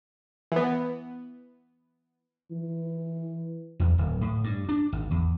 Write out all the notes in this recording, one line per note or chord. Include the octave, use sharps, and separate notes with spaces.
E3 B3
E3
E2
D1
A2
G2
D4
G#1
E2